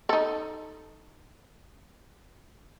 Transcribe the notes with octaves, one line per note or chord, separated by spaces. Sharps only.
D#4 A4